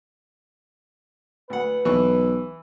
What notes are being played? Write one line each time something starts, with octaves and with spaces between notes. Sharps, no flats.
D2 B4 F#5
B1 E3 C#6